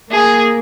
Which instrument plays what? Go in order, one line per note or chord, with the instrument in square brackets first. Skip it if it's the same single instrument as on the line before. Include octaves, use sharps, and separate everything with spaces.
[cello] A#3 [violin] G#4